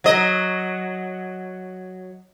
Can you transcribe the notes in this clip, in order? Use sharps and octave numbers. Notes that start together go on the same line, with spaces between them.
F#3 D#5